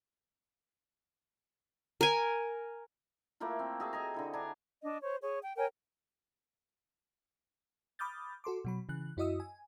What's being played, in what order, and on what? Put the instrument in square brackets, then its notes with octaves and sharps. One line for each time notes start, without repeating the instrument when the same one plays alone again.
[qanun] A#4 G#5
[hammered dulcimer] A3 A#3 E4 F4
C4
F#4 G#4 E5 A5
D#5 G#5 A#5
D3 E4 A4
D4 G#5 A#5 B5
[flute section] D4 D#5
C5 C#5
G#4 C#5
G5
A#4 C#5 G5 G#5
[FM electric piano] B5 D6 D#6 F6 G6 A6
F#4 A4 C6 D6
B2 F#3 B5
C#3 E3 F#6
F#2 E4 F#4 D#5 D#6 E6
G#5